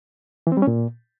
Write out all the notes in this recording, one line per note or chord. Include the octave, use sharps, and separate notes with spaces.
E3
C4
G3
C#4
A#2